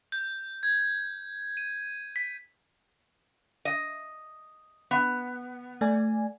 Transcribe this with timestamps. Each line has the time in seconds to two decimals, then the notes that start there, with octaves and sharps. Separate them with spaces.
0.12 G6
0.63 G#6
1.57 D#7
2.16 B6
3.65 D#5
4.91 B3
5.81 A3 D5 G#5